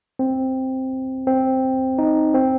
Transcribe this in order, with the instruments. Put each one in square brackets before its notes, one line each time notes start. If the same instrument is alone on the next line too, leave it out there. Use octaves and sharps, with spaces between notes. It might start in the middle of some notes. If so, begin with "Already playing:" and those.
[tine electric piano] C4
C4
D#4
C4